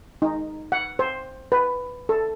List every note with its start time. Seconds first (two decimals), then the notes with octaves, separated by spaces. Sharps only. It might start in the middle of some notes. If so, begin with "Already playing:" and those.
0.22 D#4
0.72 F#5
0.99 C5
1.52 B4
2.09 A4